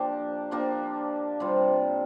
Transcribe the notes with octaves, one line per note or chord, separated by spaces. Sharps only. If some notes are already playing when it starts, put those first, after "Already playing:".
Already playing: F3 A#3 D4 G4
F3 A#3 D4 G4
C3 G3 C4 F4